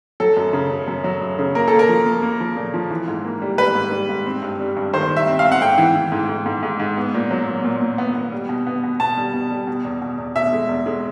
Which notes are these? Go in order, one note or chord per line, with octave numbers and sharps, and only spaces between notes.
F#3 A4
F#2
C#3
F#2
F#2
F#3
F#2
C#3
A#3 A#4
A#3 A4
A#4
F3
A#3
A#3
F3
A#2
F3
E3
G#2
A#3
G3
G3 B4
G#2
G3
G#2
C4
G2
G3
G2
D#3 C5
G3
E5
C4
F5
C4
F#5
G#2 G5
E3
E3
G#2
G#2
G#2
G#2
G#2
B3
A#2
F#3
A#2
A#2
A#2
B3
B3
G3
B2
B3
B2
B2 A5
G3
B2
G3
B2
E2
B2
E2
B2 E5
G#3
E2
G#3